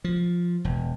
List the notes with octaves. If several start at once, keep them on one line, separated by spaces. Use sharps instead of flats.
F3
E1